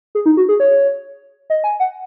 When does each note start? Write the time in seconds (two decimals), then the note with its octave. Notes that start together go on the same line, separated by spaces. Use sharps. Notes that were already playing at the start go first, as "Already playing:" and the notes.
0.15 G#4
0.26 D#4
0.37 F#4
0.49 G#4
0.60 C#5
1.50 D#5
1.64 G#5
1.80 F#5